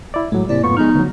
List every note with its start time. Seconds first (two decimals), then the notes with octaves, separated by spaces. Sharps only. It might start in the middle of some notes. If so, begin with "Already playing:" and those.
0.14 E4 D5
0.32 A2 F#3 G#3
0.49 G#2 C3 A#3 E4 D5
0.64 F#2 A2 B3 F4 C#6
0.77 F3 G#3 B3 D#4 F6
0.95 D2 F#3